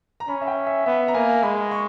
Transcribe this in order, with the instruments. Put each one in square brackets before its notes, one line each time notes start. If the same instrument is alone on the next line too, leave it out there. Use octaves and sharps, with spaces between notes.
[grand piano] A#5
[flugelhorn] C#4 [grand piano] B5
[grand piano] E5
G5
E5
[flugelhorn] B3 [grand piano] E5
[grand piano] A#5
[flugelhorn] A#3 [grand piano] G#5
[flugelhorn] G#3 [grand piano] B5
[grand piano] C#6